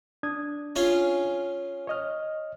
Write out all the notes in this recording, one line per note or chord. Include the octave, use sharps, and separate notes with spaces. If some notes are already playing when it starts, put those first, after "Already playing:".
D4 D#6 G#6
C#4 F4 G#4
C#5 D#5 F6